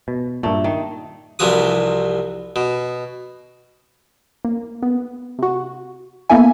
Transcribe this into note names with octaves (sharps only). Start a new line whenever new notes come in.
B2
G2 A#2 A3
D#3
C2 C3 E3 F3 F#4 D#6
B2
A#3
B3
C3 F#4
A#3 B3 E4 A4 E5 G#5